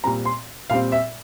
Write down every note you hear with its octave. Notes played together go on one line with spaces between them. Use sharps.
A#2 G3 C4 A#5
C6
A#2 G3 C4 F5
E5